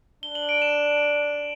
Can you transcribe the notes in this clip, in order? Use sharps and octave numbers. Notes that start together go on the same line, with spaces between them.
D4 G7
F#7
D7
E7